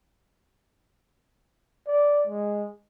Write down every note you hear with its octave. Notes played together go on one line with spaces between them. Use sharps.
D5
G#3